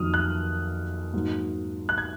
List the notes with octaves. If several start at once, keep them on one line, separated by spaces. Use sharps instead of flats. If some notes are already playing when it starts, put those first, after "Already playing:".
Already playing: F2 D#3 F#3 A#3 D#6 F6
F#6
G#2 F#3 A#3
F#6
G#6